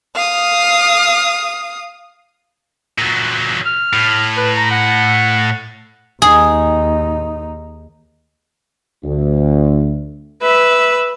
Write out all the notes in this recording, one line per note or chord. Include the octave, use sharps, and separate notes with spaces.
F5 D#6
A#2 F#3
F6
A2
B4
A#5
F#5
D#2 D#4 G#4
D2
B4 E5